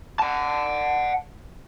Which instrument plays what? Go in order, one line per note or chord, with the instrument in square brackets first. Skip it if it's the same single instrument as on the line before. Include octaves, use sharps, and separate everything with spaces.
[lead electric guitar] F#5 A5